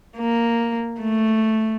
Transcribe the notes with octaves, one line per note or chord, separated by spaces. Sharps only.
A#3
A3